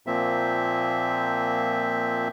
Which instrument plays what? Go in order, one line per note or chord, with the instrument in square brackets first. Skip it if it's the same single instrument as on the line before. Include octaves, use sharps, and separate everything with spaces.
[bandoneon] A#2 F3 A#3 C4 E5